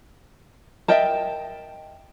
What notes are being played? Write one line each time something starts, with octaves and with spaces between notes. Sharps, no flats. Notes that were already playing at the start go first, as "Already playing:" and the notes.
A#4 D#5 E5 G5 A5